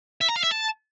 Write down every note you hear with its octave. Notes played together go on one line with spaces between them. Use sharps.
E5
A#5
F5
E5
A5